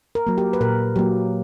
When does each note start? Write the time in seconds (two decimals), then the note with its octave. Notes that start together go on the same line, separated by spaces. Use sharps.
0.15 A#4
0.27 F#3 A#3
0.38 G4
0.53 B4
0.61 A#2 A#4
0.96 F#3 A#3 G4